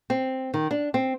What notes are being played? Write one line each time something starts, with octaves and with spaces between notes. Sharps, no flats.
C4
D#3
D4
C4